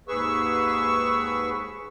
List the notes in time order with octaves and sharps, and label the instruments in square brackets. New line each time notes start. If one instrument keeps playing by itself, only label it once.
[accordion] D#2 G#2 G#4 B4 C#6 E6